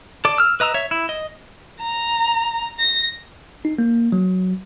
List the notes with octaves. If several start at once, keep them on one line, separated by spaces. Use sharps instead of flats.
A4 D5
E6 F6
B4 D#5 A#5 E6
C#5 E5
E4
D#5
A#5
A#6
D#4
A#3
F#3